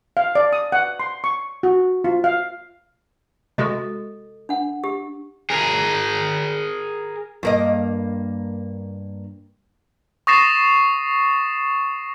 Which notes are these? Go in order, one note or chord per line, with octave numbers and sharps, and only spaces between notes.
F5
D5
D#6
F#5
C6
C#6
F#4
F4
F5
C3 G#3 F#4 A4 D#5
D4 F#5
G4
G#4 A#4
G2 A#3 D#5
C#6 D#6 A6 A#6 C7 E7